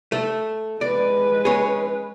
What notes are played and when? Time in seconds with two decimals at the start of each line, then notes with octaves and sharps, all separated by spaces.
0.12 A3
0.81 G#3 B4 D5
1.45 C#4 G#4